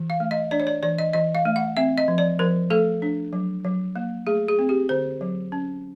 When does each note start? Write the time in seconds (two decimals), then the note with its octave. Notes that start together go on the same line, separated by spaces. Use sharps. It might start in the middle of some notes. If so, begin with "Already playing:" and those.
Already playing: E3
0.10 F5
0.20 A3
0.31 D#5
0.51 D4 D5
0.60 C#5
0.67 D5
0.83 E3 D5
0.98 D#5
1.14 E3 D#5
1.35 F5
1.45 A3
1.56 F#5
1.77 C4 E5
1.98 D#5
2.08 F3
2.18 D5
2.39 F3 A#4
2.70 A3 A4
3.02 D4
3.33 F#3
3.65 F#3
3.96 A#3
4.27 A3 G#4
4.48 G#4
4.59 C4
4.69 G4
4.89 D3 C5
5.21 F#3
5.52 C#4